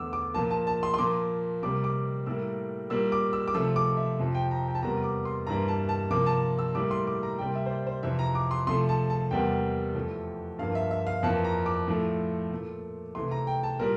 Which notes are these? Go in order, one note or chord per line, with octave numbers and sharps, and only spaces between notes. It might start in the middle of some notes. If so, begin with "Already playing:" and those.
Already playing: E2 D3 A3 D6 E6
D6
A#2 F3 A#3 A5
A5
A5
C6
C6
A#2 F3 A#3 D6
C3 G3 A#3 D6
D6
A2 G3 A#3 E6
A#2 G3 A#3 E6
D6
E6
D6
C3 F3 A3 E6
D6
E5
F2 C3 F3
G5
A#5
G5
A5
E2 C3 G3 A#3 A#5
D6
C6
G2 E3 G3 A#3 A#5
A5
A5
C3 F3 A#3 D6
A5
E6
A2 G3 A#3 D6
C6
D6
A#5
C3 G3 A#3 G5
E5
C5
D5
C5
F2 C3 E3 E5
A#5
D6
C6
C3 F3 A3 C6
A5
A5
E2 C3 G3 A#3 G5
F2 E3 A3
G2 F3 A#3 F5
E5
E5
F5
F2 E3 A#3 A5
A#5
D6
A2 F3 A3
A#2 A3
C3 E3 A3 C6
A#5
G5
A5
A#2 G3 A#4